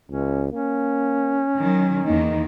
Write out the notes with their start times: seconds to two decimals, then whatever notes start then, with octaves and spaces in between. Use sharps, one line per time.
0.10 C#2 C#4
0.52 A#3 C#4
1.58 D#3 F#3
2.06 E2 D#3 A#3 D#4